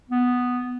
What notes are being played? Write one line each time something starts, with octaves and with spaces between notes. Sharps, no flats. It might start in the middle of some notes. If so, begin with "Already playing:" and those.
B3